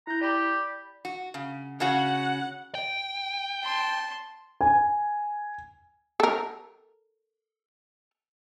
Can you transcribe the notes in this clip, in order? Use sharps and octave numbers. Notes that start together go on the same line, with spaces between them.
E4 A#5 G6
G4 D5 B5
F#4
C#3
C#3 C#4 F#4 F#5
G5
A5 C6
G#5
A4 A#4